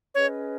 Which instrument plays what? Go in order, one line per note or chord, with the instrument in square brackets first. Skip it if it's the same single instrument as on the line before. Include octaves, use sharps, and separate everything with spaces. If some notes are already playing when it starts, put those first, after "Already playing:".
[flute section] C#4 G#4 B4 D#5 [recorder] C#5